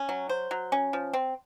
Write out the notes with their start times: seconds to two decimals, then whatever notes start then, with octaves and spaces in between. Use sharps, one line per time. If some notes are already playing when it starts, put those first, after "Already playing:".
Already playing: C#4
0.09 F#3
0.29 C5
0.51 F#3
0.72 C#4
0.93 F3
1.13 C4